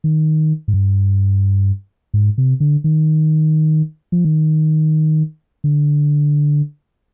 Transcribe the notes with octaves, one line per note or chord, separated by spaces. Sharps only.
D#3
G#2
G2
G#2
C3
D3
D#3
F3
D#3
D3